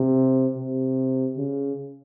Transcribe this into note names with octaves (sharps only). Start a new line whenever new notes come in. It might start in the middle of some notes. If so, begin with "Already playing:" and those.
Already playing: C3
C3
C#3